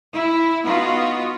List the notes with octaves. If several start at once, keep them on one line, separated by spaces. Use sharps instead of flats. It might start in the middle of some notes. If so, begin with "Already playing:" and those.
E4
B3 D#4 F4 F#4